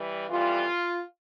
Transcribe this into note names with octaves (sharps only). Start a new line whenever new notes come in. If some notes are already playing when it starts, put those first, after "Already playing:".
Already playing: E3 G3
F2 E3 G3 F4